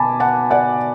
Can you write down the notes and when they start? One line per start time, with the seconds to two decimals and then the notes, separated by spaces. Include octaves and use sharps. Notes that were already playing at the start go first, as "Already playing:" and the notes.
Already playing: B2 G#5 A5 B5 D6
0.20 F#5 A5
0.50 D5 F#5